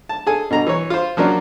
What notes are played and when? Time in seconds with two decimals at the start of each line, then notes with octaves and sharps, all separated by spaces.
0.09 A5
0.26 G#4 A4 G#5
0.50 B2 D3 A#5
0.67 E3 C#5
0.90 F4 C5
1.17 F3 F#3 A#3 C#4 D4